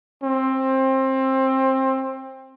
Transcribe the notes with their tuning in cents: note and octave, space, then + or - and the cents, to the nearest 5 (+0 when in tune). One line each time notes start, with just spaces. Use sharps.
C4 +20